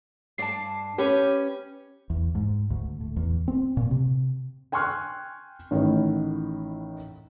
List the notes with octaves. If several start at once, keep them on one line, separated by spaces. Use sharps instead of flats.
G2 D4 D5 A5 C7
C#4 G4 B4 G5
E2
G#2
D2
A2
E2
C4
A#2
C3
G5 G#5 C6 C#6 F6 F#6
A1 A2 D#3